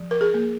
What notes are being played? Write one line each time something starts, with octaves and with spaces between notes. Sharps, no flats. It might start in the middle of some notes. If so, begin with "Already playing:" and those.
Already playing: F3
A#4
G#4
A#3